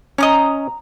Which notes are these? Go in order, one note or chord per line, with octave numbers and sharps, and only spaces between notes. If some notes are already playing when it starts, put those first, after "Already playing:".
C#4 D#5 A#5 D6 D#6